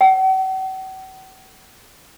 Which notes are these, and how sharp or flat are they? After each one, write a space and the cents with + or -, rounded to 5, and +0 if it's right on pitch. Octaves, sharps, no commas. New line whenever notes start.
F#5 +45